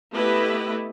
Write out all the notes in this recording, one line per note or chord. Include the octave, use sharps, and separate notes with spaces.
A3 B3 E4 G4 B4 D#5